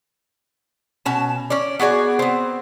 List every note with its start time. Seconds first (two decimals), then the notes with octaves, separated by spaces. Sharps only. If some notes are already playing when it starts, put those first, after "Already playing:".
1.06 B2 C#4 A5
1.50 C#4 D5
1.80 B3 F#4 G#4 D5
2.19 B3 C4